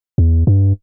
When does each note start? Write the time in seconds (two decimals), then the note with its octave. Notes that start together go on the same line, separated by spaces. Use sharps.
0.18 E2
0.47 G2